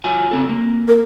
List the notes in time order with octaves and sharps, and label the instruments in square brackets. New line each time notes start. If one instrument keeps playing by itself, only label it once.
[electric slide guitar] F#3 F4 G#5
C#3 C4 A4
A#3
[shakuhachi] A#4